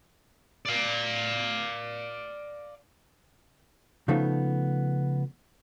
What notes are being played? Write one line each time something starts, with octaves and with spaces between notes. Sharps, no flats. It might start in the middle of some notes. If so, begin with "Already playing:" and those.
D5 F5
C#3 F3 A3 B3 D#4